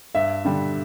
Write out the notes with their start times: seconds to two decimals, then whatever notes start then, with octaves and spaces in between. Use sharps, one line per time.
0.15 G2 E5
0.45 D3 G3